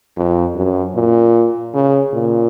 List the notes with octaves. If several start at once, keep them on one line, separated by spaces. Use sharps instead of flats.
F2
F#2
A#2
C#3
A#2